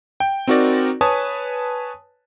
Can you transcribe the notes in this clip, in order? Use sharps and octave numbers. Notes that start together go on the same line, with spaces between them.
G5
C4 D#4 F#4 A#4 D5
B4 C#5 G#5 A5 D#6